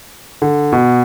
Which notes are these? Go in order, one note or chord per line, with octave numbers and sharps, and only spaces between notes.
D3
B2